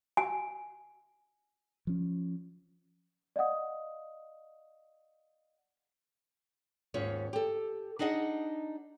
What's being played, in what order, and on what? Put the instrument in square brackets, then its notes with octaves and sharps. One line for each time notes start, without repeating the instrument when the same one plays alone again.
[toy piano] G#5
[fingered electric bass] F3 C#4
[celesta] D5 D#5 F5 F#5 D#6
[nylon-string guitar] D#2 G#2 C#4 F4 C#5
G4 A4
D4 D#4 G#4 D#5 F#5